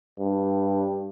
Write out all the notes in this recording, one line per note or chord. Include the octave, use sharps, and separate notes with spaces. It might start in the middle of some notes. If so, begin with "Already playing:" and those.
G2